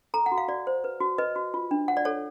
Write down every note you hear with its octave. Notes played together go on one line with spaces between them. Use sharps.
A4 A#5
F#5
F#4
F5
F#4 D5
C5
B4
F#4
B4 D#5
F#4
F4
D4
C#5 F#5
D5
A4 C#5